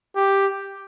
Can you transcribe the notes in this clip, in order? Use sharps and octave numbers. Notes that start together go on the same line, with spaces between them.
G4